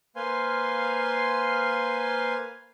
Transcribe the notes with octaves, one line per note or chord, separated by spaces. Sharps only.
A#3 B4 C5 F5 G#5 C6